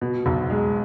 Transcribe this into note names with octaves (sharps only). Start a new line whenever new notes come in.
B2
B1
G#3